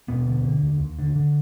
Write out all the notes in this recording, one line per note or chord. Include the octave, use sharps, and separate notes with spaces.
D#2 B2 B3
D3
D3
D#2
D#2
D3
D3